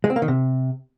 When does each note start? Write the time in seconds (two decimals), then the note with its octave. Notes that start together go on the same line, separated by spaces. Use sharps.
0.04 G#3
0.10 C4
0.16 A#3
0.22 D#3
0.28 C3